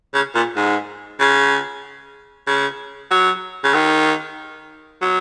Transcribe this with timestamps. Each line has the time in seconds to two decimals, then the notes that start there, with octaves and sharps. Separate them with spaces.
0.14 C#3
0.35 A#2
0.56 G#2
1.20 C#3
2.47 C#3
3.11 F#3
3.64 C#3
3.74 D#3
5.01 F#3